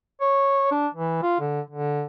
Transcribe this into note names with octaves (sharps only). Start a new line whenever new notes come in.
C#5
D4
E3
F4
D3
D3